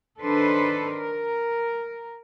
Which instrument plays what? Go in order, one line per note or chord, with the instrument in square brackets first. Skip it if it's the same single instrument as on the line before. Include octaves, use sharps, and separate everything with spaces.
[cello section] D#3 D4 A4 B4 C5
A#4